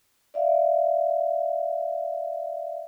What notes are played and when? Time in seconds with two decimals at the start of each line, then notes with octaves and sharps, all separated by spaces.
0.34 D5 E5 F5